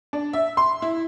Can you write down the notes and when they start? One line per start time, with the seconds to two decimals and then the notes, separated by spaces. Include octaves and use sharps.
0.13 D4
0.33 E5
0.57 C6
0.82 E4